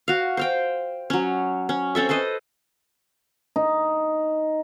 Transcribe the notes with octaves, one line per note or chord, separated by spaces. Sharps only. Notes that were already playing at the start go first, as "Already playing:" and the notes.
F#4 F5
C5 F5 G5
F#3 C#4
C#4
C4 C#4 A4 E5
A4 B4 C5 D#5
D#4